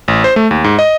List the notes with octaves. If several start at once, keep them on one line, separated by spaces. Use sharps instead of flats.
A1
C5
A3
D#2
G#2
D#5